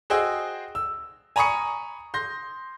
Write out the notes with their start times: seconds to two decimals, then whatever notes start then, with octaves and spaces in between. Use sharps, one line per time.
0.10 F#4 G#4 C5 D#5 G5 E6
0.75 E6
1.36 G#5 A#5 B5 C#6 D#6 C#7
2.14 C6 G6 A#6